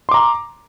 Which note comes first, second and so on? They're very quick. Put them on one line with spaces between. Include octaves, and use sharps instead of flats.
C6 D6 A#5